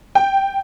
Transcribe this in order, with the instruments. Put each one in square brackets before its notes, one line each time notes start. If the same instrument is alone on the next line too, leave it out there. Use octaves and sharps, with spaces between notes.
[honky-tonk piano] G5